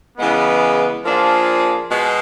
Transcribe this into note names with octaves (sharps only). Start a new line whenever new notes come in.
C#3 E3 G#3 B3
F3 A#3 D4 F4 G#4
B2 G#3